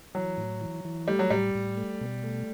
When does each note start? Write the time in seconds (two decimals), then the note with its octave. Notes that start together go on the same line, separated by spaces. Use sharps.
0.15 E3 F#3
0.38 A2
0.61 E3
0.85 E3
1.08 G3 A3
1.19 F#3
1.30 A2 G3
1.55 A2
1.77 A3
2.01 B2
2.24 A3